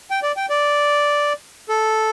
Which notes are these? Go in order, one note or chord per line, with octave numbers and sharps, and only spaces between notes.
G5
D5
G5
D5
A4